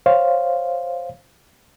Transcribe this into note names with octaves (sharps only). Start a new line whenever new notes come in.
C5 C#5 F5